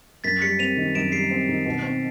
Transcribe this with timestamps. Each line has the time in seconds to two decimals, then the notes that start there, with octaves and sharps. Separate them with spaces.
0.24 F#2 A6 B6
0.42 G3 B6 C#7
0.59 C4 D#7 F7
0.77 D#3
0.95 F#2 D7 E7
1.12 G3 C7 D7
1.31 C4
1.49 D#3
1.66 B2
1.83 C4